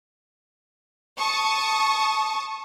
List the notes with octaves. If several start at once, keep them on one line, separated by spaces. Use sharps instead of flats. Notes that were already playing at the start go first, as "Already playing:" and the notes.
A5 C#6 D#6